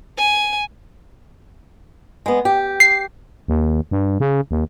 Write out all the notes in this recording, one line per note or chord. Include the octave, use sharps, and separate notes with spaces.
G#5
G#3 B3
G4
C7
D#2
G2
C#3
D#2